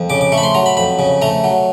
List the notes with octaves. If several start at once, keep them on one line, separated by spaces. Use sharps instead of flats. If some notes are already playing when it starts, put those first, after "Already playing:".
Already playing: F2
C#3 D6
D6
A3 C#6
B5
C6
F#3 A#5
B5
F2 B5
C#3
A3 A#5
F#3